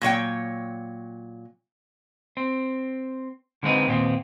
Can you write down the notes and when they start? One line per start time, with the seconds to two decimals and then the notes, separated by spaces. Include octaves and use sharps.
0.01 A#2 F#3 C#5 G5
2.37 C4
3.63 D3 G#3 C4 D#4 B4
3.87 D#2 A#2 B3 C4